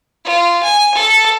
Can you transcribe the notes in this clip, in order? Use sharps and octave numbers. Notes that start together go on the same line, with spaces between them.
F4
G#5
A4